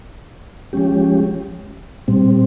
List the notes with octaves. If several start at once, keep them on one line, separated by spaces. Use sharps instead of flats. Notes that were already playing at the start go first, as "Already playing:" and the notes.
F3 G#3 C#4 G4
A#2 G3 C4